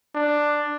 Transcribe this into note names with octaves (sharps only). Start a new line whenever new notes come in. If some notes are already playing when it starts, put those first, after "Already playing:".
D4